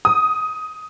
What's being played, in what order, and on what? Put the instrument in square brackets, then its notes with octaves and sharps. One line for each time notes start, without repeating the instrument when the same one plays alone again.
[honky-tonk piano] D#6